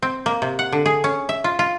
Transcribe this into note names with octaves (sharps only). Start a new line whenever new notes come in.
C4
A#3
C3
F#5
D3
G#4
C#4
E5
F4
F4